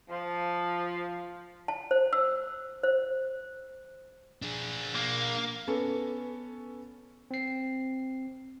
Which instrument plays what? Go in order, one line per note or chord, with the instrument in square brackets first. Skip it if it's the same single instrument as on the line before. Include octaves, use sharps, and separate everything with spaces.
[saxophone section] F3
[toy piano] A5
C5
E6
C5
[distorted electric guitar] D4 G#4
[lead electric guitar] A#3
[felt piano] B3 C#4 A4
[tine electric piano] C4 C7